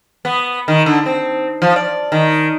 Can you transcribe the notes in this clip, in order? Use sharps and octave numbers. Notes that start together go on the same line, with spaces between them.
B3
D#3
D3
C4
F3
D5
D#3